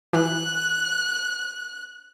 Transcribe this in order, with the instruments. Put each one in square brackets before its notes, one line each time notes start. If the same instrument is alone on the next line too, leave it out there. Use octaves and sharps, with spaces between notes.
[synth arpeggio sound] E3 [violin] F#6